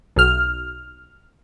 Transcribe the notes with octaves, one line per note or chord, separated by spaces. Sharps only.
B1 F6